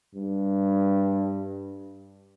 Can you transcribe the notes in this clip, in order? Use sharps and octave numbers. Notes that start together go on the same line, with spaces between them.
G2